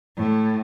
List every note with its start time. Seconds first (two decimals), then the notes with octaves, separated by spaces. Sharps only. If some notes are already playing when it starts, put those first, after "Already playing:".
0.17 A2